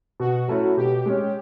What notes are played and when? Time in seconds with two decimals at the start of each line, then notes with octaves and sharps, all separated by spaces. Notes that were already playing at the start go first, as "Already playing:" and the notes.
0.20 B2 F#4
0.48 F#3 A3 C#4 E4
0.77 B2 G4
1.06 G#3 C#4